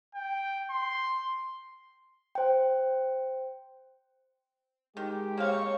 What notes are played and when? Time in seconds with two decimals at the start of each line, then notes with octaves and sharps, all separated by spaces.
0.15 G5
0.70 C6
2.35 C5 G5
4.97 D#3 G#3 G4
5.38 A#3 C4 C#5 F5 C#6